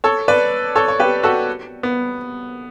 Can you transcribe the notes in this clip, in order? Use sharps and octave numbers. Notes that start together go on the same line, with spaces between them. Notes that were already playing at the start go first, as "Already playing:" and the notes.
A4 C#5
B4 D5
A4 C#5
C#5
G4 B4
F#4 A4
B3